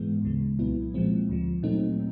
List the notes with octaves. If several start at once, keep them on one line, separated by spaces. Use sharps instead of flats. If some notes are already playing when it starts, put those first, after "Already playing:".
Already playing: G#2 E3 G#3 B3
D2 C#3 E3 G#3
C2 A#2 F#3 B3 E4
A#2 F3 G#3 C4
D2 D3 F3
A#2 F#3 A3 C4 D#4